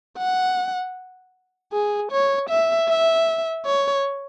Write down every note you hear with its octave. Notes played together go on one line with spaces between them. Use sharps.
F#5
G#4
C#5
E5
E5
C#5